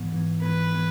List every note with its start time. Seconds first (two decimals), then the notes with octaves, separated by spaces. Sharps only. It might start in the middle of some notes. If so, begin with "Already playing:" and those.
Already playing: G#2 E3 B3
0.12 G#2 E3 B3
0.42 G#2 E3 B3 B4
0.74 E3 B3